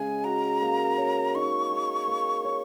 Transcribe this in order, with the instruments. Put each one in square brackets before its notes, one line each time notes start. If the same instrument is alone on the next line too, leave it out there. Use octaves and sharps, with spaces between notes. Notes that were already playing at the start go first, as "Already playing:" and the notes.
Already playing: [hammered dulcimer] C#3 G#3 [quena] G#5
[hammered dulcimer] F#4 [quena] A#5
[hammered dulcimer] A#3
C#5
[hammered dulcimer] D#4 [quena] C#6
[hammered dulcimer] G#4
A#3
C#5